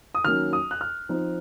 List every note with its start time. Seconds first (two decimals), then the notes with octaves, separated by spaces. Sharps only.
0.15 D#6
0.25 D#3 F#3 A#3 C#4 F6
0.53 D#6
0.71 F#6
0.81 F6
1.09 F3 C4 D#4